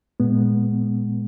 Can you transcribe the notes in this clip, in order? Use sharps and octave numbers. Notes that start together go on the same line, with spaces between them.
A#2 G#3 B3